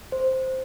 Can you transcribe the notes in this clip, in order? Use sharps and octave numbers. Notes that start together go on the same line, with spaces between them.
C5